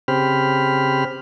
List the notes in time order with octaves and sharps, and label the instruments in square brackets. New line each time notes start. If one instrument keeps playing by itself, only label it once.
[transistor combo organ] C#3 C4 G4 C5 B5 F6